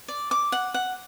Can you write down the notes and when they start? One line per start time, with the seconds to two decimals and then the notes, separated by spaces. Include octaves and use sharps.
0.08 D5
0.31 D6
0.52 F#5
0.74 F#5